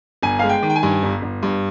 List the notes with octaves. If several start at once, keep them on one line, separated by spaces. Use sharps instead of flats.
G1 G#5
G#3 F5
G5
D#3
G5
G#5
G2
G1
G1
G2